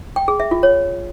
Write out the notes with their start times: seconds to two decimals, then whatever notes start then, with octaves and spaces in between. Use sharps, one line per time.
0.16 G5
0.28 G#4
0.40 E5
0.51 F4
0.63 C#5